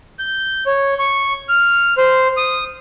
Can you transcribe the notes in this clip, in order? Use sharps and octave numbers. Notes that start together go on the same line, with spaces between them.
G6
C#5
C#6
F6
C5
D#6